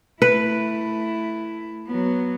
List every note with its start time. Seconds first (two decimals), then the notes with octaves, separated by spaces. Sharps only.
0.22 A3 E4 B4
1.87 F#3 B3